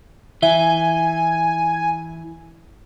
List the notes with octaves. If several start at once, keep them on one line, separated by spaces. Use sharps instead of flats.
E3 E5 G#5 G7